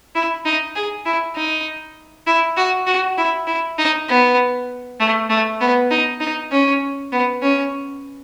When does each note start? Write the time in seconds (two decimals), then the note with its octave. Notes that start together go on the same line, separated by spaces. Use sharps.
0.15 E4
0.45 D#4
0.75 G#4
1.05 E4
1.35 D#4
2.26 E4
2.57 F#4
2.87 F#4
3.17 E4
3.47 E4
3.78 D#4
4.08 B3
5.00 A3
5.30 A3
5.60 B3
5.91 D#4
6.20 D#4
6.51 C#4
7.12 B3
7.42 C#4